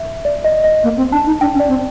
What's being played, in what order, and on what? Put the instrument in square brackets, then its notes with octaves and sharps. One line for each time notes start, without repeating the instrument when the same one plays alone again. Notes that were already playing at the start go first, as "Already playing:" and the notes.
Already playing: [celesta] E5
D5
D#5
D#5
[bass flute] A#3
C4
[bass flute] D4 [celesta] A5
[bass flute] D#4
[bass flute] D4 [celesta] G5
[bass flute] C#4
[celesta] D5
[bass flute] C4